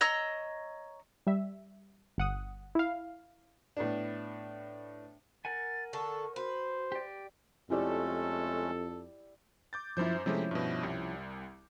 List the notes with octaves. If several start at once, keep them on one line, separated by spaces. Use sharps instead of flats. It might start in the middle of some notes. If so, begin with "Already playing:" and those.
C#5 D#5 A#5 E6
G3 E5
G1 F#5 D#6
E4 F5
A2 B3 D4
A#4 F#5 G#5 A6
D3 A4 C#6
F#4 B4 C5
G4 D5
F2 G#3 A3 C#4 E4 G4 A4 D5
D6 G6 A6
F#2 F3 E4 C5 G6
C3 F3 G#3 A3 C#4 E4
G2 B2
C2 G3